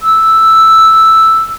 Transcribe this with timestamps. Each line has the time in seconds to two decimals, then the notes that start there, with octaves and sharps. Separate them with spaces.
0.01 E6